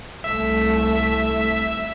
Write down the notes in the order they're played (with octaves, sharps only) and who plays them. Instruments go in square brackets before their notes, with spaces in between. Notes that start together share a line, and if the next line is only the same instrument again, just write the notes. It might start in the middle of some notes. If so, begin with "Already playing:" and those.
[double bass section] C2 A3 [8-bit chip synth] E5 B6